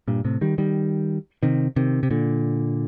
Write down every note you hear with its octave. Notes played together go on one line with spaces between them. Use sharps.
G2 A#2
A2 C3
D#3 G3
D#3 G3
C3 D#3
C3 D#3
C3
A#2 D3